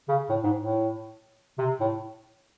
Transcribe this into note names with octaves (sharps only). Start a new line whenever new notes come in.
C#3
A2
G#2
A2
C3
A2